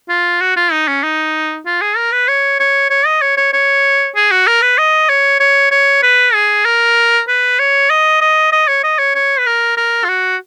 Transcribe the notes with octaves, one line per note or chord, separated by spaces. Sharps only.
F4
F#4
F4
D#4
C#4
D#4
F4
G#4
A#4
B4
C#5
C#5
C#5
D#5
C#5
C#5
C#5
G#4
F#4
A#4
B4
D#5
C#5
C#5
C#5
B4
G#4
A#4
B4
C#5
D#5
D#5
D#5
C#5
D#5
C#5
C#5
B4
A#4
A#4
F4
F#4